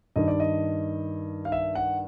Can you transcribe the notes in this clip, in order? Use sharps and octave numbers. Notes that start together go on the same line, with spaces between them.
G2 D#3 D#5
D5
D#5
F5
E5
F#5